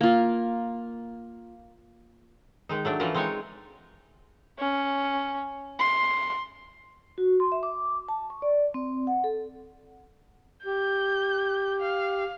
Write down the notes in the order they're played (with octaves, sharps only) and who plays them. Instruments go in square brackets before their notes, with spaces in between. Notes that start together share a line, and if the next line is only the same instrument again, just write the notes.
[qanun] A#3 F4
[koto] D#3 G#3 D#4
F#3 A3 D4
E3 F3 A3 C#4 F4 A#4
G#3 C4 D#4 C#5 G#5
[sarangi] C#4
C6
[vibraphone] F#4
C6
E5
D6
A5
C#6
D5
C4
F#5
A4
[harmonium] G4 [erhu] G6
[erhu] F5